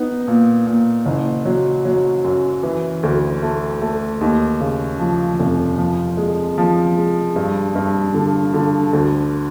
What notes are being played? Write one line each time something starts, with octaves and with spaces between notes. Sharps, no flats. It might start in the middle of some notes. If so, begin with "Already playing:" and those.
Already playing: B3 D#4
A#2
A#2
F#1
F#3
F#3
F#2
E3
D2
A3
A3
D#2
C#3
F3
F1
F3
G#3
F3
G#3
G2
G2
D3
D3
D2